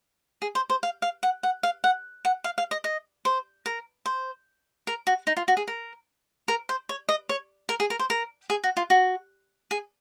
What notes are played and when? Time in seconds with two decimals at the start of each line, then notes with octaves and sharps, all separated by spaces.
0.42 G#4
0.55 C5
0.70 C5
0.83 F5
1.02 F5
1.23 F#5
1.43 F#5
1.63 F5
1.84 F#5
2.25 F#5
2.44 F5
2.58 F5
2.71 D#5
2.84 D#5
3.25 C5
3.66 A#4
4.06 C5
4.87 A#4
5.07 F#4
5.27 D#4
5.37 F4
5.48 F#4
5.57 G#4
5.68 A#4
6.48 A#4
6.69 C5
6.89 C#5
7.09 D#5
7.29 C#5
7.69 A#4
7.80 G#4
7.90 A#4
7.99 C5
8.10 A#4
8.50 G#4
8.64 F#4
8.77 F4
8.90 F#4
9.71 G#4